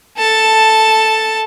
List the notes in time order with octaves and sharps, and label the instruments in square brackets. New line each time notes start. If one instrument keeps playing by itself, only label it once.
[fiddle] A4 A5